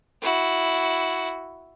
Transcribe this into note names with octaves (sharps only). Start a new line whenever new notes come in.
E4 F#4